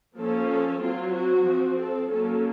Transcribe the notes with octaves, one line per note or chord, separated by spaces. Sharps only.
F3 A#3 C#4 A4
A4
F#3 C4 F4
F#4
F3 C4
A4
F#3 A#3 C#4 A4